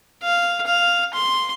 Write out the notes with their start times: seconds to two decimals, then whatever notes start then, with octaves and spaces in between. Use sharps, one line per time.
0.23 F5
0.67 F5
1.14 C6